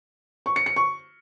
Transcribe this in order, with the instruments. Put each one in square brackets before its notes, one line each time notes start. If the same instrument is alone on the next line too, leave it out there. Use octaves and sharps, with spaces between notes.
[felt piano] C#6
C#7
C#7
C#6